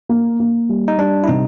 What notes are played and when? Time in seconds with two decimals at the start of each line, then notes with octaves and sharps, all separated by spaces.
0.09 A#3
0.40 A#3
0.69 G3
0.88 D#4
0.98 G3 D4
1.24 E4
1.27 C3 D#4